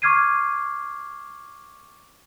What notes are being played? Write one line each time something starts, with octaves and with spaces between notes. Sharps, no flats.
C#6 D6 F6 G#6 C7 D#7